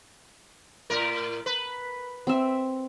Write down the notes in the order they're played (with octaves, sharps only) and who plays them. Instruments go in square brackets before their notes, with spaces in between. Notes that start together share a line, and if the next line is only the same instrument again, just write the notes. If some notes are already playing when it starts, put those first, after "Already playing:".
[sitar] A2 A#4
B4
[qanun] C4 E5